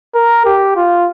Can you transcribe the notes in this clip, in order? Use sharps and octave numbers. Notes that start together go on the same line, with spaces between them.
A#4
G4
F4